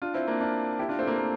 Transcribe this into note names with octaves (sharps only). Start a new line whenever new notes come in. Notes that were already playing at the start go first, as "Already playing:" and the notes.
D4 F4
C4 E4
A#3 D4
D4 F4
E4 G4
D4 F4
A3 C4
A#3
A#3